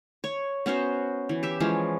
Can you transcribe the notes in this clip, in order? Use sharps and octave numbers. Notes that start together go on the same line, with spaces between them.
C#5
B3 C#4 F#4 C5
E3
G4 E5
E3 F3 G#3 C#4